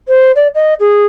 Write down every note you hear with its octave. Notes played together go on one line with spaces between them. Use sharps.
C5
D5
D#5
G#4